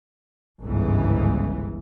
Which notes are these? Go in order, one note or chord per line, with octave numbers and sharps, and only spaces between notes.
G1 C#2 G#2 C#3 E3